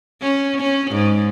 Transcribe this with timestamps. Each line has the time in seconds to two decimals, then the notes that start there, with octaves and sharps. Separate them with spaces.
0.22 C#4
0.61 C#4
0.91 G#2